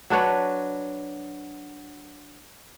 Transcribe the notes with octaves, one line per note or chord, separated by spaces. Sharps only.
F#3 D4 B4 C#5